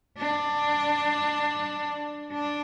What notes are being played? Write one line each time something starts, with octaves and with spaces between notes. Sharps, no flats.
D4
D4